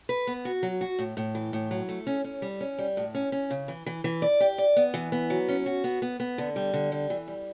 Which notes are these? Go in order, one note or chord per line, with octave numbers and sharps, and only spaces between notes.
B4
B3
F#4
F#3
F#4
A2
A2
E3
A2
F#3
A3
C#4
C#4
G3
C#4
G3
A2
C#4
C#4
C#3
E3
E3
E3
D5
G4
D5
B3
E3
B3
F#3
C#4
F#4
B3
B3
B3
D3
G3
D3
G3
E3
G3